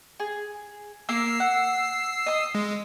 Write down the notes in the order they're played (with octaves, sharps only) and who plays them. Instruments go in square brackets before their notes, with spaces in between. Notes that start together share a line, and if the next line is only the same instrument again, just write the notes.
[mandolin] G#4
[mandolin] A#3 A#4 [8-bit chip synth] E6 C7
[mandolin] F#5
D#5 D#6
[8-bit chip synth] G#3